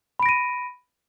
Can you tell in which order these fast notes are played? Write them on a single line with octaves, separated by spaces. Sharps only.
B5 D7 A#6 D#7